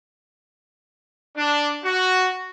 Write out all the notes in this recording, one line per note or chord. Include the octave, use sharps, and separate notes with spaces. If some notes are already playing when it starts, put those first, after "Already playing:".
D4
F#4